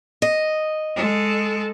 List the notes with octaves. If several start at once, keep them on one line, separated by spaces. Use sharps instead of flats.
D#5
G#3 A4